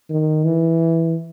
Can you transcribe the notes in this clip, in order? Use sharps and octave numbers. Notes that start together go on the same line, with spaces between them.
D#3
E3